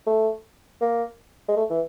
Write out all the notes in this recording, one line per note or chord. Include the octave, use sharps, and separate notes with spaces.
A3
A#3
G#3
A3
E3